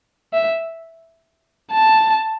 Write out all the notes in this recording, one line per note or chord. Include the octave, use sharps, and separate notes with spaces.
E5
A5